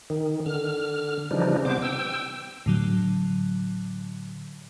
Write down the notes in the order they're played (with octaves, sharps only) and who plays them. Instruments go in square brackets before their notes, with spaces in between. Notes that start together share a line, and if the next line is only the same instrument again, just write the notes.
[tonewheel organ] D#3
D3 F6
C#3 E3 F3 G3 D4 D#4
C3 B3 C5 D6
G5 E6
[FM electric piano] A2 D3 F#3